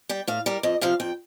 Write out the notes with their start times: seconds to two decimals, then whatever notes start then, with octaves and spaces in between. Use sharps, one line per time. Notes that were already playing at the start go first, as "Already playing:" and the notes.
0.09 G3 G5
0.27 A2 F5
0.46 G3 A#4
0.63 F2 D#5
0.81 C3 F3 F5
1.00 F2 G5